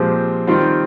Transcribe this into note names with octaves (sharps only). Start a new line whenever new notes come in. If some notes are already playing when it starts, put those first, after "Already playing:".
Already playing: A#2 F3 G#3 C4 G4
D#3 G3 C4 F4 C5